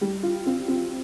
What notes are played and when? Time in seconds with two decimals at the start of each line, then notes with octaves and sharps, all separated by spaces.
0.01 G3
0.23 F4
0.46 C4
0.68 C4